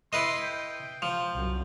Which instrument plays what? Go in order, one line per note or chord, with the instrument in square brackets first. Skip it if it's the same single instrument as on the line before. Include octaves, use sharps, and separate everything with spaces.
[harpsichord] E4 B4 D#5 [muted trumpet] C6
[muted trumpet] G5
[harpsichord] F3
[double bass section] C2 F#2